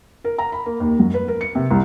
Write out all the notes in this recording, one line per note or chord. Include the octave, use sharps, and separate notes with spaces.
A#4
A#5
B5
A#3
D#2
F#2
B4
A#4
C#7
C3
C2